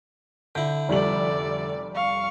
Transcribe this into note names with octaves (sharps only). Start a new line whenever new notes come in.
D3 E4 G6
F1 G3 A4 D5 F#7
F5 C#6